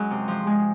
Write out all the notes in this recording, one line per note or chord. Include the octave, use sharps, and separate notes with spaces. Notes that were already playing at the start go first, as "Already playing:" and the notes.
Already playing: F#2 G#3
C3
F3
G#3